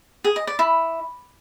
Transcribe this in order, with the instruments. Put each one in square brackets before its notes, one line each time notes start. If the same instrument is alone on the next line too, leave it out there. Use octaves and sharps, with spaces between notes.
[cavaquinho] G#4
D#5
D5
E4